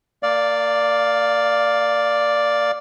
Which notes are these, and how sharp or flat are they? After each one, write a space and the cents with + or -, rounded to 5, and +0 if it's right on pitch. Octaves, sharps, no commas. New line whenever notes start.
A#3 -30 D5 +0 F5 +5